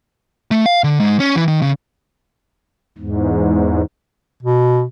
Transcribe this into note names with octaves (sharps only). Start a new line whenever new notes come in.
A3
F5
D3
G#2
C#4
E3
D#3
C#3
E2 G#2
B2